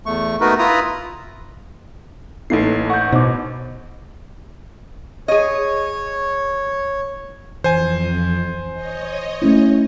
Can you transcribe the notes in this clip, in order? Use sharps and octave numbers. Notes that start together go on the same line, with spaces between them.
E2 A3 C#6
A3 B3 D#4 F#4 A#4 B4
E4 F4 B4 E5 A#5 D#6
A1 E3 A3 A#3 D#4 A4 C7
F#5 C#6 G6
B2 D#4 C5 D6
G#4 C#5 D#5
F2 E3 C5 G#5
C#5 D#5
A3 C#4 E4